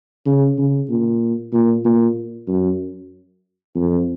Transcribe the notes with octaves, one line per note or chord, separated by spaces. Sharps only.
C#3
C#3
A#2
A#2
A#2
F#2
F2